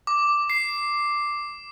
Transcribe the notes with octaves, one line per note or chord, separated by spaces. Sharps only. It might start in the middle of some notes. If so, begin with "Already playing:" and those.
D6
C7